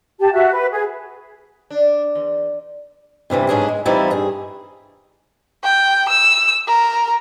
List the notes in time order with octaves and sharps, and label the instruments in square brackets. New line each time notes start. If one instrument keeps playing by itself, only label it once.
[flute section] G4 A5
F#4 E5
B4
G#4
[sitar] D4
E2
[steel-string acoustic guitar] G2 C3 E3 G3
G#2 F#3 C#4 D4 G#4
G#3
E3 F3 G3 C4 D#4 E4
G2 G#4
[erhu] G5
E6
A#4